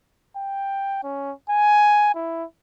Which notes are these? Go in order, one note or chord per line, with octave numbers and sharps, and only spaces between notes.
G5
C#4
G#5
E4